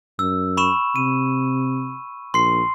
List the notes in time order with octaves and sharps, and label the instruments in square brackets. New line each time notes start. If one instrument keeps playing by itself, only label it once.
[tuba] F#2 [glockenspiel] E6
[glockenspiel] B5 C#6 E7
[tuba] C3 [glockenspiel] D#7
[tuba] A#1 [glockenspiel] C6 C7